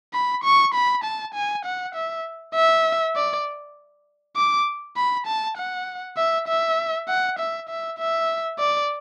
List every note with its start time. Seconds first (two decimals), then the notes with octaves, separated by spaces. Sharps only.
0.14 B5
0.44 C#6
0.74 B5
1.04 A5
1.34 G#5
1.65 F#5
1.95 E5
2.55 E5
3.16 D5
4.37 D6
4.97 B5
5.27 A5
5.57 F#5
6.17 E5
6.48 E5
7.08 F#5
7.39 E5
7.69 E5
7.99 E5
8.59 D5